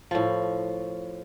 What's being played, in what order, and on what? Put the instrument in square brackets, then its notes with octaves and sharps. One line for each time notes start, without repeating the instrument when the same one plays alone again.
[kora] A2 F3